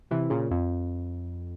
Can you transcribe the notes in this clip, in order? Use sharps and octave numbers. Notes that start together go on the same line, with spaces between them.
C3 E3
A#2 C#3
F2